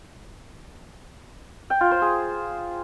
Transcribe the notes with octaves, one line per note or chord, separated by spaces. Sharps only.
G5
F4
C5
G#4